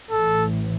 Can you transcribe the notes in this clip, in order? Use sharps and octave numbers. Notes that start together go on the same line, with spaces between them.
A1 A2 E3 A4